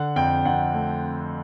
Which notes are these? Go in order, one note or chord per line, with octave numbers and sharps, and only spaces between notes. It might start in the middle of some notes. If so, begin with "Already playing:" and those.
Already playing: D3 F#5
F2 G5
F2 F#5
A3